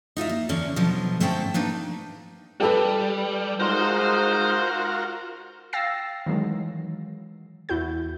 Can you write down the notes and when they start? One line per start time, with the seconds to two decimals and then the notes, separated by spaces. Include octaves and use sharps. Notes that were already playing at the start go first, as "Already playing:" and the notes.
0.17 D#4 F4 F#4 E5
0.29 A#3
0.49 E2 D3 C#4 D4
0.76 B2 D3 F3 F#3
1.20 G#2 A3 C#4 C5 G5 A5
1.54 A#3 D4 D#4 B4
2.60 G3 G4 A4 B4
3.60 G#3 D#4 F4 F#4 A#4 C5 C6
5.73 F5 G5 E6 A6 A#6 C7
6.26 D#3 E3 F#3 G#3
7.69 E2 E4 F#4 G6